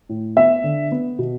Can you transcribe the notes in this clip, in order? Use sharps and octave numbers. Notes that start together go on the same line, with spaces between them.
A2
B3 E5
D3
B3
B2